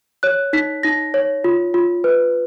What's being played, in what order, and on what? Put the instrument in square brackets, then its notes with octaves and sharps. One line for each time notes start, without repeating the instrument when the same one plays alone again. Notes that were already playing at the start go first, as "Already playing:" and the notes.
[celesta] C#5 F#6
D#4 B6
D#4 A#6
C#5
F4
F4
B4